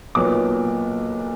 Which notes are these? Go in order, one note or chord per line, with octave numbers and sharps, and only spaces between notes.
B1 A#2 F#3 B3 D6